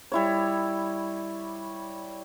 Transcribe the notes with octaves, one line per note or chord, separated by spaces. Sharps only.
G3 E4 C#5